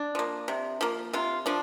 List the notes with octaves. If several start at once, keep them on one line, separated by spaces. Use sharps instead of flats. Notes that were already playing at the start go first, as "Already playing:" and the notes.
Already playing: D4
F3 A#3
C3
F3 A#3
C3 F4
F3 D4